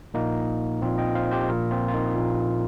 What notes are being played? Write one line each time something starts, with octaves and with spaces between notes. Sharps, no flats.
A#1 A#2 A#3 D#4
A#1 A#2 C4 F4
D#5 G5
C5 F5
G4 C5
A#1 A#2 F4 A#4
C4 F4
F4
A#3 D#4
A#1 A#2